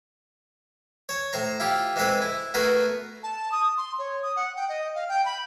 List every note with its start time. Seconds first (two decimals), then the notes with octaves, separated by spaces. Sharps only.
1.09 C#5 A5
1.33 A2 C5 A#5
1.60 E4 F4 G4
1.96 E3 G#3 C4 A4 B4 C5
2.22 E4
2.54 A3 B3 F#4 G#4 A#4 B4
3.23 A5
3.52 D#6
3.77 C6
3.99 C#5
4.22 D#6
4.36 F#5
4.56 G5
4.69 D#5
4.95 F5
5.09 G5
5.25 B5